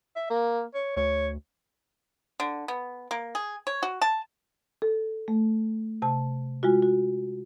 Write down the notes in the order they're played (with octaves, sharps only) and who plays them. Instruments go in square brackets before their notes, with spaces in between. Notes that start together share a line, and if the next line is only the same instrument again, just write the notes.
[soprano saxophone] E5
A#3
C#5
[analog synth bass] D2 [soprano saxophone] C#5
[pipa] D3
B3
A#3
G#4
C#5
F#4
A5
[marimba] A4
A3
C3 A5
G#3 F4 F#4
F#4